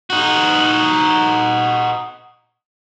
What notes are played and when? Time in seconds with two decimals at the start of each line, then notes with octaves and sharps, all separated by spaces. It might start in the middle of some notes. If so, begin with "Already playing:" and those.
0.10 D#4 F#4